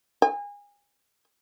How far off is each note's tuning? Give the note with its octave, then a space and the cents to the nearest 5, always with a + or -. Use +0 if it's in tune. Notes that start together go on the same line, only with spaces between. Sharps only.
G#5 -30